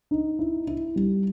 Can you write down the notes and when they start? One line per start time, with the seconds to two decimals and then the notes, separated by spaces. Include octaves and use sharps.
0.11 D#4
0.39 E4
0.67 E4
0.96 G3